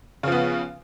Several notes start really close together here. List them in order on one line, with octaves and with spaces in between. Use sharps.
C#3 F3 B3